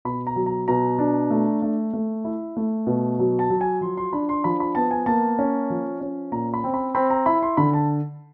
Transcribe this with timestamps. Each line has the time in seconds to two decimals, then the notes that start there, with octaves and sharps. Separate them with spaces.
0.05 B2 B5
0.27 A#5
0.36 F#3
0.46 A#5
0.68 B2 A#5
0.99 D4
1.31 A3
1.62 A3
1.93 A3
2.25 E4
2.57 A3
2.87 B2
3.19 F#3
3.39 A5
3.50 F#3
3.61 G#5
3.81 F3 C6
3.97 C6
4.12 D4 B5
4.29 C6
4.44 F3 B5
4.60 B5
4.75 B3 A5
4.91 G#5
5.06 A#3 A5
5.39 C#4
5.70 F3
6.01 C#4
6.32 A#2 A#5
6.54 B5
6.64 C4
6.74 B5
6.95 C4 B5
7.10 A#5
7.26 E4 B5
7.42 C6
7.57 D3 B5
7.73 A5